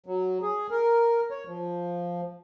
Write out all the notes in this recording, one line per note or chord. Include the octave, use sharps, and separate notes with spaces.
F#3
G#4
A#4
C#5
F3